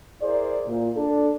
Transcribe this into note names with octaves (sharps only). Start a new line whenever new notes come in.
E4 G#4 A#4 C5 D5
A#2
D4 A4